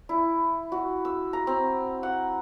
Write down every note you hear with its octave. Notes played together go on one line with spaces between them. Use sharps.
E4
F#4
E6
A#5
C4
F#5